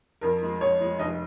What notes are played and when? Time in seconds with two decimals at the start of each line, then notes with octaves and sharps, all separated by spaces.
0.21 F2 A#4
0.41 F3 G#3
0.61 F2 C#5
0.80 F3 G#3
0.99 F1 D#5